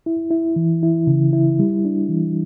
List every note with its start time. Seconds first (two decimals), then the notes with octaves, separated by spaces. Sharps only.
0.06 E4
0.31 E4
0.56 E3
0.83 E4
1.07 C#3
1.33 E4
1.59 G3
1.85 D4
2.09 E3